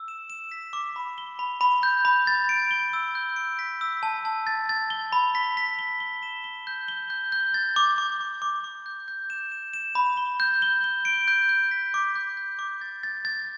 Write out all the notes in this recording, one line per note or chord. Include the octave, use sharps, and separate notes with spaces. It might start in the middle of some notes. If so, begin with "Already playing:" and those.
Already playing: E6
E7
E7
B6
D6
B5
G7
B5
B5
G6
B5
A6
D7
G7
E6
G6
D7
B6
E6
A5
A5
A6
A6
G7
B5
B6
B6
G7
G7
E7
G7
G6
G7
G6
G6
A6
D6
D6
D6
D6
D6
G6
G6
E7
E7
E7
B5
G7
G6
G7
G7
D7
G6
G6
B6
D6
G6
G6
D6
A6
A6
A6